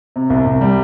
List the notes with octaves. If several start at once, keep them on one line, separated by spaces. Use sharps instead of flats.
C3
C2
C2
G3